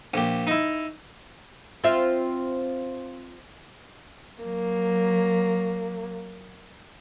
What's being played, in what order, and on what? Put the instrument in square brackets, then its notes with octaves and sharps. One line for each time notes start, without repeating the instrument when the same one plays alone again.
[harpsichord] A#1 G4
D#4 E4
[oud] C4 F4 E5
[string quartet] F#3 A#3